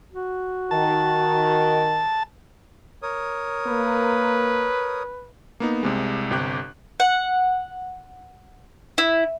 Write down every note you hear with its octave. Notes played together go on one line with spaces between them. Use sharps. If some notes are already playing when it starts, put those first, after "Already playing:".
F#4
D#3 A5
A#4 C#5 D#6
A#3 B4
A#3 B3 D#4
C2 C3 G#3
G1 C3 G4 F#6
F#5
E4